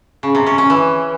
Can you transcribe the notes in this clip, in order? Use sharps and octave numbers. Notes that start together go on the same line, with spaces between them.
C#3
C3
C#4
C#4
E3